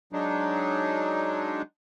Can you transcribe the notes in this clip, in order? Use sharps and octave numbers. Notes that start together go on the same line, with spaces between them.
F#3 G#3 D4 D#4